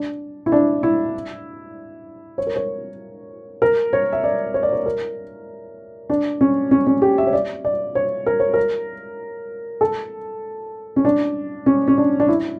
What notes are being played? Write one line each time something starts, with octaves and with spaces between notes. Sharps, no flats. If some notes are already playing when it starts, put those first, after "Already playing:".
Already playing: D4
E4
D4
E4
C#5
A#4
C#5
A#4
C#5
E5
D5
C#5
D5
C#5
A#4
D4
C#4
C#4
C#4
G4
E5
C#5
D5
D5
C#5
A#4
C#5
A#4
A4
C#4
D4
C#4
C#4
D4
D4
E4